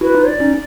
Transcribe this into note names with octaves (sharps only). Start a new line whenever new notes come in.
E4 F#4 B4
D#4 F4
D5
C#4 D#4